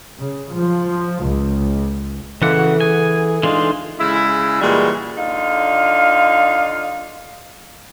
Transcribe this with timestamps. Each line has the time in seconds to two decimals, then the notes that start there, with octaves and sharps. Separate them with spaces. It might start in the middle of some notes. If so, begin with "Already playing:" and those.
0.19 C#3
0.56 F3
1.24 C#2
2.42 C#3 E3 G#3 A#3 A4 F#5
2.57 F#4
2.80 G#4 G#5
3.43 E3 G#3 D4 D#4 F4 C6
3.98 C#3 G#3 E4
4.61 A#2 E3 G3 G#3 F#4
5.17 D3 D#4 F4 F5